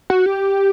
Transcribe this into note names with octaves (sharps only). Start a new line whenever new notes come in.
F#4
G4